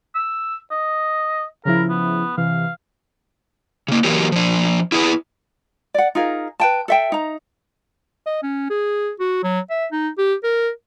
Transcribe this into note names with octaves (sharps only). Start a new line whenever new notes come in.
E6
D#5
C#3 F3 E4 A#4
B3
C3 E3 F5
C#3 A#3
E3 F#3 A#3 G4
F3 D4
E4 G#4 B4
D5 F#5
D#4 F4 G#4 A#4
B4 G5 A5
A4 E5 G5
D#4 A#5
D#5
C#4
G#4
F#4
F#3
E5
D#4
G4
A#4